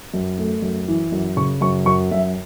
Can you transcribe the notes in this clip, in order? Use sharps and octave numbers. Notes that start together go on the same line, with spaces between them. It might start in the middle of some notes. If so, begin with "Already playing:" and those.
F#2
A3
F#2
E3
F#2
C#3 C#6
F#2 C#6
F#2 C#6
F#2 E5